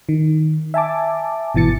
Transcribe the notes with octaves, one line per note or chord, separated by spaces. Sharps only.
D#3
E5 G#5 A5 D6
G#1 B2 E3 A6 C#7